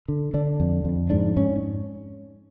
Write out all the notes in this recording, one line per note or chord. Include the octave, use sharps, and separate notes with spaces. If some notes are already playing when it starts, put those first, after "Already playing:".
D3
D3 D4
F2
F2
G#2 D4
G#2 C#4